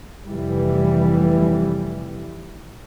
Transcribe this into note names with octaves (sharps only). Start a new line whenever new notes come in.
F1 E3 G3